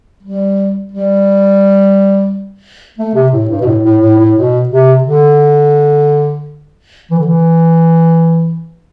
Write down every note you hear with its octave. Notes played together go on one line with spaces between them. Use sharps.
G3
G3
A3
C3
A2
G2
B2
A2
A2
A2
A2
B2
C3
D3
E3
D3
E3